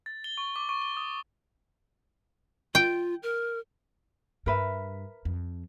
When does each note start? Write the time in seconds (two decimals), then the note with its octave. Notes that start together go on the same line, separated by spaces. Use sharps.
0.06 A6
0.24 G7
0.38 C#6
0.56 D6
0.69 C#6
0.82 G7
0.97 D#6
2.75 F4 G5
3.23 A#4
4.46 G2 A#4 B4 E5
5.25 F2